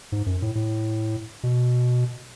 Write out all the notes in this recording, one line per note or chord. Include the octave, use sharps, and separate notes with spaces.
G#2
F#2
A2
A2
B2